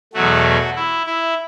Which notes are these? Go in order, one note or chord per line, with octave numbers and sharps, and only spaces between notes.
E2 B2 F#3 A3 F#4
E4
E4